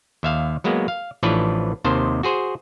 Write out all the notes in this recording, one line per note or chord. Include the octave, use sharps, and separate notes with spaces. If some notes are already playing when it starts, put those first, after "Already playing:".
D#2 E5 F5
F#3 G#3 A#3 B3
F5
A1 E3 F3 D4 B4 C#5
D#2 C3 D#3 C5 A5
F#4 G#4 C5